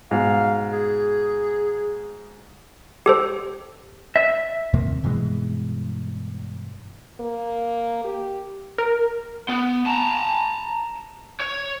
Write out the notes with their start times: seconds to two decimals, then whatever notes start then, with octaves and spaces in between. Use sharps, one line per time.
0.11 G#2 B2 F5
0.72 G#4
3.06 G4 A4 C5
4.16 E5
4.73 D#2 C3 A#3
5.04 G2 B2 E3 G#3
7.20 A#3
8.05 G4
8.78 A#4
9.49 B3
9.86 A5 A#5
11.40 C#5